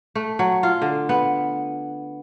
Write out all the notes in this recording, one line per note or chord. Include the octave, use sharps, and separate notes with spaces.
A3
F#3
F4
D3
B3